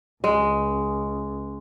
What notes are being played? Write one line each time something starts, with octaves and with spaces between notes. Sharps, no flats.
C#2 G#3